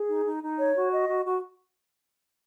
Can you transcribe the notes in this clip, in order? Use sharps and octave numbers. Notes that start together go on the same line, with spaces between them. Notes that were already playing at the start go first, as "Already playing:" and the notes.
Already playing: G#4
D#4
D#4
D#4
C#5
F#4
D#5
F#4
F#4